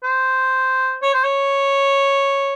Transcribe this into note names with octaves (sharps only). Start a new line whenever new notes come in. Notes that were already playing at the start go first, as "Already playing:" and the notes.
C5
C#5
C5
C#5